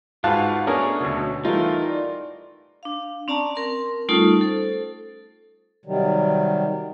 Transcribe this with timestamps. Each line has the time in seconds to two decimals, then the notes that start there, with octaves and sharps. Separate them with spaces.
0.24 G#2 F4 F#4 B4 F5 A5 F#6
0.67 A3 B3 C#4 D4 G#4 A#4 C#5
1.00 D2 B2
1.45 E3 G3 A3 D#4 F4 A#4
1.88 D5
2.83 D4 F5
3.28 C4 C#4 D5 A5 A#5
3.55 C4 A#4 C6
4.09 G3 A3 C#4 D#4 F4 A4
4.41 A4 C5
5.86 C3 D#3 F#3 G3